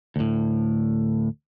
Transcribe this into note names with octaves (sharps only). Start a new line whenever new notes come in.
D2 A2